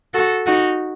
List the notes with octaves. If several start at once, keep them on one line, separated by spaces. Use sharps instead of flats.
F#4 A4
D#4 F#4